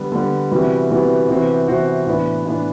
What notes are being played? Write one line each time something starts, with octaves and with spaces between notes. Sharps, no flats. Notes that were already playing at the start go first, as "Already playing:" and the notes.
Already playing: D3 G3 B3
D3 G3 B3
C3 E3 G3 B3 F#4
C3 E3 G3 B3 F#4
C3 E3 B3 F#4 C5
C3 E3 B3 F#4 C5
A2 E3 B3 D4
A2 E3 B3 D4